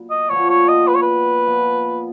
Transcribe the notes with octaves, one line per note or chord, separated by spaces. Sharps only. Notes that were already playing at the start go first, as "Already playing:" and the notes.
Already playing: A#2 F#3 B3
D#5
A#2 F3 B3 F#4 C#5
C#5
D#5
B4
C#5
B4
A#2 F3 B3 F4